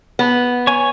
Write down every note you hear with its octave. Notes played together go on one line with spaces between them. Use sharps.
B3
C#5 G#5